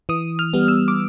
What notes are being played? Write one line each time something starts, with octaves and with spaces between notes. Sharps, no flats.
E3 D#6
F6
G3 B3
E6
D6